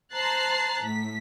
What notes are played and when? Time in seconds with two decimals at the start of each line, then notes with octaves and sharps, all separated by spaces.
0.14 C5 A5 A#5 F#6 A6 C7
0.83 A2 B6